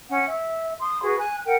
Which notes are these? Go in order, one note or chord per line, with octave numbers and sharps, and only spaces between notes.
C#4 F#5
E5
C6 D#6
F#4 G#4 B4
G#5 F#6
A#4 F#5 G5